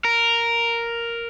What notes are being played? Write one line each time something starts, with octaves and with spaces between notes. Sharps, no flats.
A#4